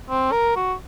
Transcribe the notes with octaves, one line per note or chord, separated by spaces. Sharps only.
C4
A#4
F#4